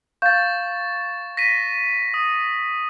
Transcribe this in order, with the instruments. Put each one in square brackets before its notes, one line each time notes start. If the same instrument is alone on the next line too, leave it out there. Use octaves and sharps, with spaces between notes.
[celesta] F5 G6 [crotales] C#6 A6
[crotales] A#6 B6 D#7
D#6